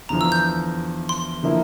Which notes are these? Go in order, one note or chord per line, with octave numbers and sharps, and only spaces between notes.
E2 D3 F3 A#5
E6
G6
C6
D3 F3 A#3 E4